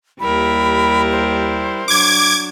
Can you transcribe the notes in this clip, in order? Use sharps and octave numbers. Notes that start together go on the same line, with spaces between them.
D#2 G3 E4 A#4 B5
C5
F#3 D4 D6 G#6